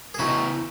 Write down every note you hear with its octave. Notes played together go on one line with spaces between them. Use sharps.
G#4
C#3 E3 B3 D#4 E4 F#4